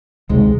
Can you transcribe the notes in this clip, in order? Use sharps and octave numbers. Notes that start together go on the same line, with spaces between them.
C#2 C3 D#3 G#3